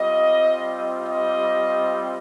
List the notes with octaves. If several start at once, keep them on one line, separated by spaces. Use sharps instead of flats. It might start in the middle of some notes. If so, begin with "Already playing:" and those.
Already playing: G3 C4 F4 D#5
D#5